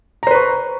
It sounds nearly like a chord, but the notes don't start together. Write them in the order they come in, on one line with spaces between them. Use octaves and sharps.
A#5 C5 B4 C#6